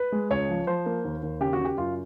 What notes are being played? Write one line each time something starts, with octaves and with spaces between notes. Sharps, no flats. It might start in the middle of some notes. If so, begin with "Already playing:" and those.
Already playing: B4
G#3
C#2 C#5
F3
F3 C5
A#3
D#2
D#2
C#3 G4
F#4
C#3
G4
F#2 F4